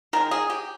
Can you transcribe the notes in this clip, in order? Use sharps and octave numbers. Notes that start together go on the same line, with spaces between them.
D#3 G#3 A#4
G#4
G4